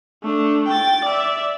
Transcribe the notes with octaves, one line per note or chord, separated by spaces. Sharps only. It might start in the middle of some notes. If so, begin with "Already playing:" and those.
A3 D4
G5 A6
D5 E5